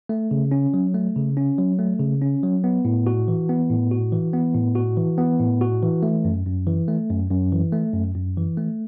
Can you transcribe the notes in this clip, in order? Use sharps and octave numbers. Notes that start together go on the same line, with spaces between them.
A3
C#3
C#4
F#3
A3
C#3
C#4
F#3
A3
C#3
C#4
F#3
B3
A2
F#4
E3
B3
A2
F#4
E3
B3
A2
F#4
E3
B3
A2
F#4
E3
A3
F#2
F#2
E3
A3
F#2
F#2
E3
A3
F#2
F#2
E3
A3